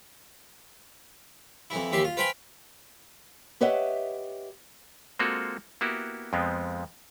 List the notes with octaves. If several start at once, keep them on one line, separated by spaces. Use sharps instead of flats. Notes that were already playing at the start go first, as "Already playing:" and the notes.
F2 E3 E4
D#2 E3 G4 E5 C6
F4
B4 C5 F5 G5 G#5 B5
G4 B4 C#5 D#5 E5 F#5
G#3 A#3 C4 F4 F#4 A4
A#3 B3 E4 F#4 G4
F2 F3 G#3 B3 C4